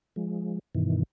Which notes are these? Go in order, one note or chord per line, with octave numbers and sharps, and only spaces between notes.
F3 G#3
G2 B2 D#3 E3